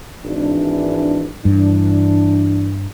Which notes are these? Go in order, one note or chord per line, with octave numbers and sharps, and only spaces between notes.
G#1 E3 D4
G2 E3 D4